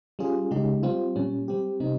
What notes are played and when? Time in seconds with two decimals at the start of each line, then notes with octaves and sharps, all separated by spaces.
0.19 G3 C#4 F4 G#4
0.51 C#3 G#3 D#4 G4
0.83 G3 C4 F4
1.16 A#2 G3 C#4
1.48 G3 C4 G4
1.80 C3 G3 C4 D#4